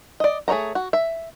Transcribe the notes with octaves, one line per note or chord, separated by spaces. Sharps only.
D5 D#5
A3 G#4 C#5 D#5 A#5
F#4
E5